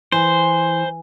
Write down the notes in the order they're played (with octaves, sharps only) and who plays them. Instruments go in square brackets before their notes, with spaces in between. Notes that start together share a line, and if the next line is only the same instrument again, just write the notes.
[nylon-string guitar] E3 [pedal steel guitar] C5